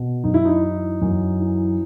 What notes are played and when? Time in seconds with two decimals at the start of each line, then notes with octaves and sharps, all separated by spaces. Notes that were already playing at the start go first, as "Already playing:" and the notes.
Already playing: B2
0.24 F#2 D#4
0.34 E4
0.45 D#4
0.63 E3
1.01 F#2
1.40 E3